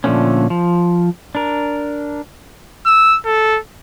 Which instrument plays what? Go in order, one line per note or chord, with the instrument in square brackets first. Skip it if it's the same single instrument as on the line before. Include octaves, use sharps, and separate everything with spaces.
[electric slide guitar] A#2 D3 F3 A3 B3 C#4
F3
D4 A#4
[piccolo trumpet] E6
A4